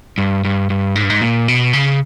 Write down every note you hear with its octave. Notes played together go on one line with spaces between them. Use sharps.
G2
G2
G2
G#2
G2
G#2
A#2
B2
C#3